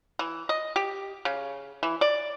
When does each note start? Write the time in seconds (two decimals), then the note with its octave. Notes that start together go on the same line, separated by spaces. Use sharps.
0.19 E3
0.49 D#5
0.76 G4
1.25 C#3
1.83 E3
2.01 D5